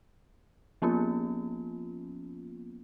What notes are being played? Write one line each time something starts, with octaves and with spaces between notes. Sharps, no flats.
F3 A#3 B3 C#4 F4